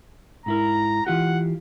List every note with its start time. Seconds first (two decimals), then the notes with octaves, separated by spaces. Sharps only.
0.46 G#2 E4 A#4 A#5
1.07 E3 F4 G4 F#5